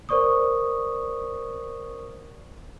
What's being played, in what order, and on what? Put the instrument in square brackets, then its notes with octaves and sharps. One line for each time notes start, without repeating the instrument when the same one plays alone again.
[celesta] A#4 C5 D5 C#6 D#6